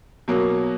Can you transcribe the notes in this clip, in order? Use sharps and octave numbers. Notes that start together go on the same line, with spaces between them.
B2 F#3 A#3